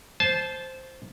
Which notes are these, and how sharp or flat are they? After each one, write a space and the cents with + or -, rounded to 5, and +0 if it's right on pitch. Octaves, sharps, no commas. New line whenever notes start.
C5 +0 A5 -25